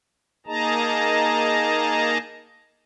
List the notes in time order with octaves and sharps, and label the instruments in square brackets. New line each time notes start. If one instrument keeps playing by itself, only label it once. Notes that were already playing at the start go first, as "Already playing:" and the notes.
[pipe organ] A#3 D#4 G#4 D#5 A5 A#5